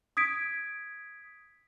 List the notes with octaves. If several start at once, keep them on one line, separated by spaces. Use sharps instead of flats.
D#6 G#6 B6 D7